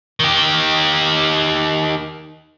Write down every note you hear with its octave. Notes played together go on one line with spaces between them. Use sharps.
D#3 G4